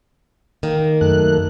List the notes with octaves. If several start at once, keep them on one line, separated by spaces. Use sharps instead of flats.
D#3 A#3
F#2 A3 F#6